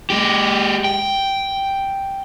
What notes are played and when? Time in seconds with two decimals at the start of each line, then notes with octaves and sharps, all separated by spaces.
0.10 G#3 G4
0.84 G5